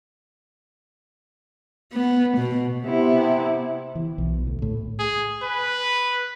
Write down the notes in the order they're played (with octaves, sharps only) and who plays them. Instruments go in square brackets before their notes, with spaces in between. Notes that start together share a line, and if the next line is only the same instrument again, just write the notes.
[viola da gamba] B3
B2
[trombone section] C3 [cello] B3 E4
[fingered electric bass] E3
B1
D2
A2
[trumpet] G#4
B4